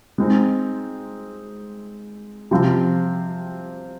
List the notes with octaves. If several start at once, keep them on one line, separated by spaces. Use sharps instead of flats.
G#3 C4 D#4
C3 F3 C4